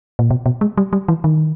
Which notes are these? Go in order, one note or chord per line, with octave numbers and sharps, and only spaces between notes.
A#2
B2
B2
G#3
G3
G3
E3
D#3